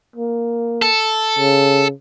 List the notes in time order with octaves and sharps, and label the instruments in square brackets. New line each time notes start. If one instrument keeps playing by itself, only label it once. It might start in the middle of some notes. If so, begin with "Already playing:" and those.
[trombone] A#3
[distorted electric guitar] A4
[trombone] C#3